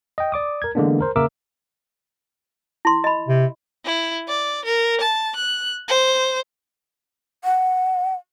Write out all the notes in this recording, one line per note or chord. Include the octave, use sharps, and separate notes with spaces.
D#5 G5
D5 D6 D#6
A#4 G#6
D3 E3 G#3 A#3 B3 D4
A#4 C5
C#3 A#3 A#4 E5 D6 E6
E4 C6
D#5 B5
C3
E4
D5
A#4
A5
F#6
C5
F#5